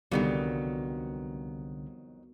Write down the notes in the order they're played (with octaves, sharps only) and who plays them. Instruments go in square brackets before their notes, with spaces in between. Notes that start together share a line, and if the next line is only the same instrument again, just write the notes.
[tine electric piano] C2 D3 [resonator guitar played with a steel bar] F2 D#3 F#3 [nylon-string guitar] G3 [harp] B3 F#4